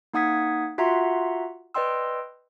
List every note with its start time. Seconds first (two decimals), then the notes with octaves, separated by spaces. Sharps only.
0.13 A#3 D#4 F#5 D#6 G#6 B6
0.78 F4 F#4 E5 F#5 A#5 C6
1.74 B4 D5 D#5 G5 C6 E6